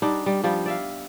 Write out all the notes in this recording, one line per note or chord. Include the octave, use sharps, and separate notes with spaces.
G3 D4 D#4
G3
F3 G3 B3
D5 E5 F5